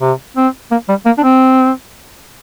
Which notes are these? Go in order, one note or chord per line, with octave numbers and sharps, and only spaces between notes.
C3
C4
A#3
G3
A#3
D4
C4